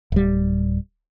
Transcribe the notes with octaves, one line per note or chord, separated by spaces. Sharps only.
D1 G3